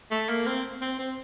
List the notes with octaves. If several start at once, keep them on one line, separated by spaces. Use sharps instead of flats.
A3
A#3
C4
C4
C4